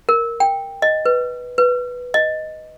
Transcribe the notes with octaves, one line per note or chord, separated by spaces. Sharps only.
A#4
G5
D#5
B4
B4
D#5